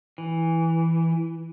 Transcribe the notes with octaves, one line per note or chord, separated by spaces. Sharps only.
E3